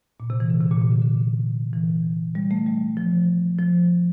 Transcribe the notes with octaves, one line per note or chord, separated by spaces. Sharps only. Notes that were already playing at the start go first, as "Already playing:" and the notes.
A#2
C3
E3
D3
C3
A#2
A#2
D3
D3
E3
G3
A3
G3
F3
F3